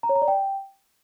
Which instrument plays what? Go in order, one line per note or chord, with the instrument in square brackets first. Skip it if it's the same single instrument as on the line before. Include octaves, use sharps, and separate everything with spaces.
[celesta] A#5
C#5
A#5
D5
G5